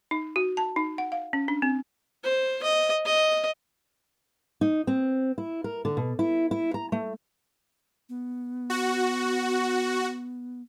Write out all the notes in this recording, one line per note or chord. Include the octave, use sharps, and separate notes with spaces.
D#4
F#4
A5
D#4
F#5
F5
C#4
D4
C4
C5
D#5
D#5
D#4
C4
E4
A#4
D3
B2
E4
E4
A#5
A3
B3
F#4